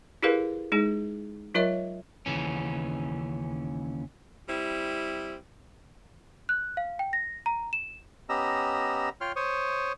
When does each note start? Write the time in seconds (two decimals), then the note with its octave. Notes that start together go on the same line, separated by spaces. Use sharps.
0.23 E4 G4 G#4 A#4 B4 F5
0.72 G#3 D#4 G#4
1.54 F#3 F4 A#4 C#5 D#5 E5
2.26 D#2 C#3 E3 C#4
4.48 G3 C4 E4
6.49 F#6
6.77 F5
6.99 G5
7.13 A#6
7.46 A#5
7.73 E7
8.29 B3 C#4 G4 D#5 A#5 E6
9.21 F4 C#5 G5 C6 F6
9.36 C5 C#5 C#6 D#6